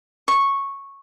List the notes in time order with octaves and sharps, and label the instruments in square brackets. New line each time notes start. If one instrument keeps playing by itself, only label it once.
[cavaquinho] C#6